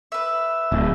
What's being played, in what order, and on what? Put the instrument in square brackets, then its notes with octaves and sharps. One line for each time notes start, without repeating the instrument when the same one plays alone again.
[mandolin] B4 E5
[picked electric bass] D1